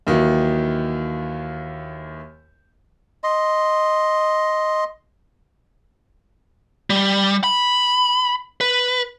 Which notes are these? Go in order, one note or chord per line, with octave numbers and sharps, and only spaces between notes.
D#2 D#3 E3 F#3
D#5 C6
G3
B5
B4